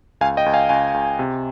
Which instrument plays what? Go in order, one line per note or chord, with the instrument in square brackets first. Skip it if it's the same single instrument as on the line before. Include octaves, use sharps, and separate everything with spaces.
[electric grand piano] C#2 F5 G#5
D#5 G5
C#2
F5 G#5
C#2 F5 G#5
C#2
C3